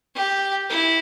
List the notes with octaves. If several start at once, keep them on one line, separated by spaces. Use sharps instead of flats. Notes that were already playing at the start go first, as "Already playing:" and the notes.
G4
E4